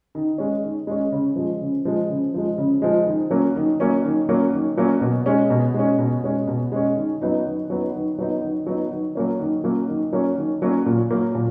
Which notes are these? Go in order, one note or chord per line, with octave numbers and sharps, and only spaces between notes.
D#3
G#3 C#4
D#3
G#3 C#4
C#3
F3 G#3
C#3
F3 G#3
C#3
F3 G#3
C#3
F3 G#3
D#3
F#3 A#3 C#4
D#3
F#3 A#3 C#4
D#3
F#3 A#3 C#4
D#3
F#3 A#3 C#4
B2
G#3 C#4
B2
G#3 C#4
B2
G#3 C#4
B2
G#3 C#4
D#3
F#3 B3 D#4
D#3
F#3 B3 D#4
D#3
F#3 B3 D#4
D#3
F#3 B3 D#4
D#3
F#3 A#3 C#4
D#3
F#3 A#3 C#4
D#3
F#3 A#3 C#4
D#3
F#3 A#3 C#4
A#2
F#3 A#3
A#2